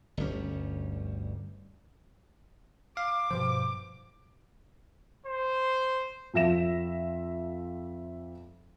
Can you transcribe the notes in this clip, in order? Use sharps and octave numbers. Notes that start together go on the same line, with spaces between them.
G1 D2 G3 C#4
F5 D6
G2 B2 F3 C5
C5
F2 F3 E5 A#6 E7